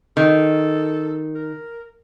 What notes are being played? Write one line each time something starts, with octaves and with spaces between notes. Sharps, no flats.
D#3 A4
A#4